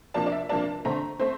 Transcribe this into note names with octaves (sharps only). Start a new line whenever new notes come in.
C3 F3 A#3 D4 A5
D5
E5
C3 F3 A#3 D4 A5
D3 A3 C4 A#5
A3 C4 C5